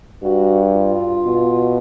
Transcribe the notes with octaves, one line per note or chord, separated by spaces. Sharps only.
G2 F#4
F4
B2